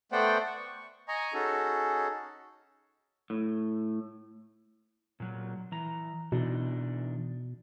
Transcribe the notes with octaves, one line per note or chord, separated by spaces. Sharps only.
A3 B3 C5 D5 F#5 G5
C#6
D#5 G#5 A#5 C#6
C#4 D#4 F#4 G#4 A4
A2
A#2 F#3
E3 A#5
B2 E3 D4 D#4